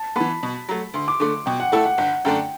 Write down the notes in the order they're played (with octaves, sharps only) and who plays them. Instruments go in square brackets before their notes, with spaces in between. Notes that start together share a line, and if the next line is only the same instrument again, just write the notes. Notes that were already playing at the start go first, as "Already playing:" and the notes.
Already playing: [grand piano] A5
[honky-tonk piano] E3 B3 [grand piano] B5
[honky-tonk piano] B2
F#3 A3
[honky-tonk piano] D2 [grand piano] C6
[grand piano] D6
[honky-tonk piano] D3 A3 [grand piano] D6
[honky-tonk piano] B2 [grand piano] G5
[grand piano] F#5
[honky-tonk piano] A3 E4 A4 [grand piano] F#5
[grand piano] F#5
[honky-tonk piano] G1 [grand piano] F#5
[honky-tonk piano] F#2 D3 A3 D4 [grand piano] G5